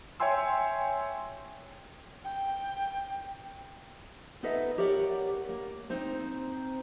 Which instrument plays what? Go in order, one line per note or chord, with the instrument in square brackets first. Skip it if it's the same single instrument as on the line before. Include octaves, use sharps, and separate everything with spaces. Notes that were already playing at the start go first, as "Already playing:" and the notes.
[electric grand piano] C#5 E5 G5 G#5 C6 E6
[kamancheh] G5
[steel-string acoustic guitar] B3 D#4 A4 B4 D#5 E5
G4 A#4 C#5 D5 F5 F#5
A#3
C4 D#4 C5